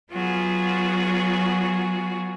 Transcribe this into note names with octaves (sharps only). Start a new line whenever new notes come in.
F#3 B3 F4 F#4 G#4